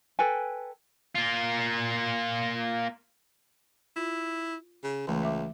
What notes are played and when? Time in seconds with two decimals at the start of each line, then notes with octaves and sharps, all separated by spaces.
0.19 A4 B4 G5 G#5
1.15 A#3 F4
3.96 E4 F4
4.84 C#3
5.07 C#2 E3 A3
5.23 E5 D6